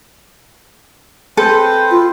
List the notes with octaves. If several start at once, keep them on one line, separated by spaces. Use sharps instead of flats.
C4 A4 B4 C5
F4